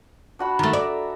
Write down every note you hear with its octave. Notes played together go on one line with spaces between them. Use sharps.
D4 F#4 B5
D#3 A3 E5 A#5
D5